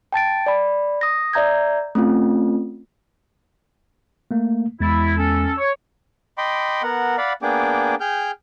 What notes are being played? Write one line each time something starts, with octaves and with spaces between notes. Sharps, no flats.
G5 A5 A6 D7
D5 B5
D#6 A#6
D5 E5 A#5 G6 G#6
A3 C4 C#4 F4
A3 A#3
E2 G#3 E4 A6
C#4 A4
C#5
D#5 G5 B5 C6 D6
B3 A#4 F#5
D5 F5 F#5 B5
A#3 B3 D4 G#4 G5 D6
G#4 G5 F6 G6